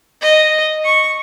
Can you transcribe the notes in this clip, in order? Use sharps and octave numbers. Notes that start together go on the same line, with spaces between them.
D#5
C#6